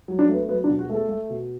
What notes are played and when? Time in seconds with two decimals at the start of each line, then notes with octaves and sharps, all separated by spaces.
0.08 F#3
0.19 D4
0.28 A3
0.33 B3
0.48 F#3 B3
0.64 D4
0.69 B2
0.79 F#4
0.89 A3 A4
1.09 A3
1.30 B2